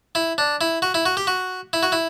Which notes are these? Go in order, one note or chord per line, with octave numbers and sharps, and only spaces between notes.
E4
D4
E4
F#4
E4
F#4
G4
F#4
E4
F#4
E4